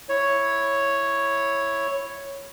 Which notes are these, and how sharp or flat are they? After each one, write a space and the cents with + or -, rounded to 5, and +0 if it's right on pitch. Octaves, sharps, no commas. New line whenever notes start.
E4 +0 C#5 +0